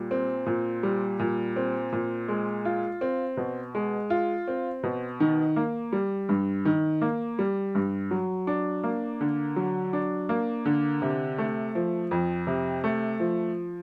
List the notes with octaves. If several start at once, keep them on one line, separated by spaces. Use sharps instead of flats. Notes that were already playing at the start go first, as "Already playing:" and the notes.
Already playing: A#2 G3
C4
A#2
G3
A#2
C4
A#2
G#3
F4
C4
B2
G#3
F4
C4
B2
D#3
A#3
G3
G2
D#3
A#3
G3
G2
F#3
D4
A#3
D3
F#3
D4
A#3
D3
C3
A3
F3
F2
C3
A3
F3